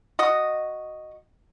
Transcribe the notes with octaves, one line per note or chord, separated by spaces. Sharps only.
F#4 D#5